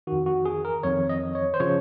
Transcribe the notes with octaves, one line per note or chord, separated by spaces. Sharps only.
F2 D#3 F#4
F#4
G#4
A#4
F2 D#3 C#5
D#5
C#5
C5
C#3 F3 C#5